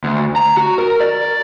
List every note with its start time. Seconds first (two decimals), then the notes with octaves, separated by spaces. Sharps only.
0.04 D2
0.36 A#5
0.57 F#4
0.78 A#4
1.01 D5